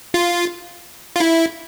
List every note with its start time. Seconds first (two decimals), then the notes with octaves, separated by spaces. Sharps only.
0.14 F4
1.16 F4
1.20 E4